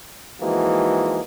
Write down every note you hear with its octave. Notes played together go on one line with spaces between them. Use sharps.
E3 F3 G#3 A#3 D#4 F#4